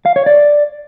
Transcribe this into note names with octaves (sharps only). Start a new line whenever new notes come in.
F5
C#5
D5